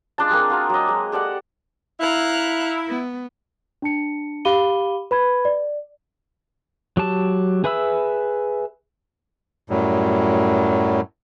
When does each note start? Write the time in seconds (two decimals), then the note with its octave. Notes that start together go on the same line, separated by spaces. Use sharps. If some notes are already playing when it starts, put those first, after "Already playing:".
0.18 G#3 D4 F4 A5
0.31 A#3 C4 G#4
0.50 F4 F#4 A#4
0.70 F#3 D#5
0.88 G#3
1.12 G4 A4 D5 F#5
2.00 E4 F5 A#5 F#6
2.85 B3
3.82 D4 A5 C#7
4.45 G4 F5 B5 D6 D#7 G7
5.11 B4 B5 G#6
5.45 D5
6.97 F#3 G4 A5
7.64 G#4 B4 E5 B5 E6
9.70 F#2 A2 F#3 G3